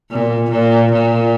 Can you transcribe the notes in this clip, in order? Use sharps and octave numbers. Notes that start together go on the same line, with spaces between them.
A#2
A#2
A#2